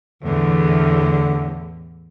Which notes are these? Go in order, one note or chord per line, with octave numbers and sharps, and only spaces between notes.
E2 A2 D3